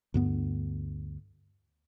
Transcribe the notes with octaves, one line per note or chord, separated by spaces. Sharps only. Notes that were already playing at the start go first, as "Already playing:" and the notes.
D2 G2 B3